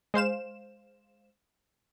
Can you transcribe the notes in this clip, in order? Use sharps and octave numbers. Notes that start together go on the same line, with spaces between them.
G#3 C5 F5 E7